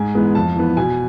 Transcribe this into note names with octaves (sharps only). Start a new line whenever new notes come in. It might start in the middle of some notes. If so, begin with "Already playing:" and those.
Already playing: G#2 G#5
E3 G#3 B3
F2 A5
E3 B3
B2 G#5